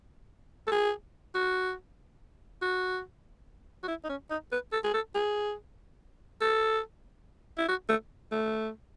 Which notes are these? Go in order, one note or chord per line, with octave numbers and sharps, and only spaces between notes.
A4
G#4
F#4
F#4
F#4
E4
D#4
C#4
D#4
B4
A4
G#4
A4
G#4
A4
E4
F#4
A3
A3